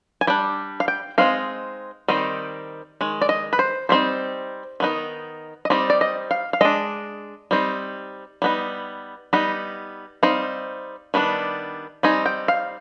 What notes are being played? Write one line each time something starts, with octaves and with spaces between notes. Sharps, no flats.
G#5
G3 D4 G5
F5
G5
G#3 C4 D#4 F5
D#3 G3 C4 D#4
D#3 G#3
D5
D#5
B4
C5
G3 C4 D#4 C5
D#3 B3 D#4
D#5
G3 C4 D#4 D5
D5
D#5
F5
F5
G#3 D4 D#5
G3 C4 D#4
G3 B3 D#4
G3 B3 D#4
G3 C4 D#4 F5
D#3 G3 B3 D4
G3 C4 D#4 G#5
G5
F5